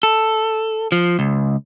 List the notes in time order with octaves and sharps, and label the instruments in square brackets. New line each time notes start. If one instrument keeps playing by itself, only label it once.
[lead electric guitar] A4
F3
C#2